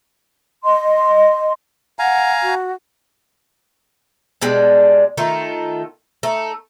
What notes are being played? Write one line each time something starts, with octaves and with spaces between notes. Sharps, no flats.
D#5 C6
F5 F#5 G#5 A#5
F#4
B2 G3 G#3 D4
D#3 A3 F4
A3 D#4